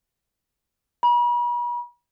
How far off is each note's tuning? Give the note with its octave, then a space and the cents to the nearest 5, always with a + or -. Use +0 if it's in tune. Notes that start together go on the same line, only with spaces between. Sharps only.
B5 -45